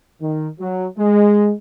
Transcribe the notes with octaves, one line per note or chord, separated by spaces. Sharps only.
D#3
F#3
G#3